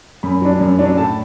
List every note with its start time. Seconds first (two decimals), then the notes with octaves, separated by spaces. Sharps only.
0.23 F#2 B5
0.42 F#3 D4
0.61 F#2
0.79 F#3 D4
0.98 A2 A5